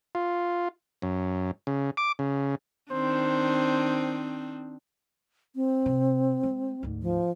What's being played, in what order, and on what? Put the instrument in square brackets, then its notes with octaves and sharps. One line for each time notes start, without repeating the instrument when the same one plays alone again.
[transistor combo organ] F4
F#2
C#3
D6
C#3
[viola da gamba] D#3 C4 D4 [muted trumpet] C5
[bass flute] C4
[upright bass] C3
G#3
D2 G#2
[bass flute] F3